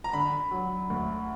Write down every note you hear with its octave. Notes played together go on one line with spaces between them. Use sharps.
A#5
D3 B5
F#3
D2